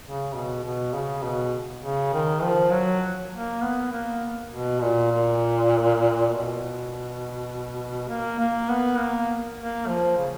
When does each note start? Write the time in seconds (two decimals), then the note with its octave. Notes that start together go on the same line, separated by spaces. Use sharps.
0.04 C#3
0.34 B2
0.63 B2
0.94 C#3
1.23 B2
1.83 C#3
2.13 D#3
2.43 F3
2.72 F#3
3.32 A#3
3.62 B3
3.92 A#3
4.51 B2
4.81 A#2
5.11 A#2
6.29 B2
8.08 A#3
8.39 A#3
8.69 B3
8.98 A#3
9.58 A#3
9.87 F3
10.18 C#3